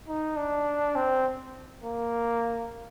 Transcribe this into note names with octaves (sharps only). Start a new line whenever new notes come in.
D#4
D4
C4
A#3